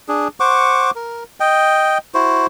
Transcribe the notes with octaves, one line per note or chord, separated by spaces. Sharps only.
D4 G#4
C5 F#5 C#6 D6
A#4
D#5 G5
E4 F#4 C5